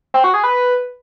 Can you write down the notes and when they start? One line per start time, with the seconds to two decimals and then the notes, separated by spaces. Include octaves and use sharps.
0.14 C4
0.24 F#4
0.34 G#4
0.44 B4